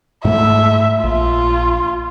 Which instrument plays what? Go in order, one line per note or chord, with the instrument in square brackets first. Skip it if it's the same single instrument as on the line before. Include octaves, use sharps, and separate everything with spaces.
[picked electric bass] G#2 A3 [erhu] E5
[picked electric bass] A#1 [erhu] F4